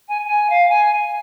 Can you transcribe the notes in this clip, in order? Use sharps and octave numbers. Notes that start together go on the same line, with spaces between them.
G#5
G#5
F5
G#5